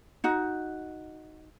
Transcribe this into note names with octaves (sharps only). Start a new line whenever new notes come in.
D#4 F#4